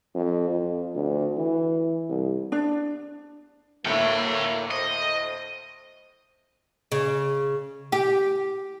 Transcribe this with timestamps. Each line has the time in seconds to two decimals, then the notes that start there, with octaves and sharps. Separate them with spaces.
0.15 F2
0.49 F2
0.95 D2
1.37 E3
2.09 C2
2.52 D4
3.85 D2 A2 A#3 E4 C#5 G5
4.71 C5 D#5
6.92 C#3
7.92 G4